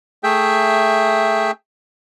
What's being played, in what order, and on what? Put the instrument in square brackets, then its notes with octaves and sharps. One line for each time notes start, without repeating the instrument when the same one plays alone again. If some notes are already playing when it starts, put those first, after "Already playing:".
[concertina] A3 G#4 E5 G5